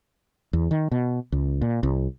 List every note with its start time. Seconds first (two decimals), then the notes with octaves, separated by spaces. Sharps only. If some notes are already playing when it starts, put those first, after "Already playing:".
0.53 E2
0.71 D#3
0.92 B2
1.32 C#2
1.62 A#2
1.83 C2